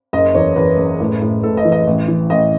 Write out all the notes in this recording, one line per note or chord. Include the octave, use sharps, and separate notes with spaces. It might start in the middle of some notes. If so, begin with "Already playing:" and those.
F#1 D#5
E2 C#5
E2 B4
F#1
A2
A2
A2 A4
D#5
E3
D#5
A1
E3
A1 D#5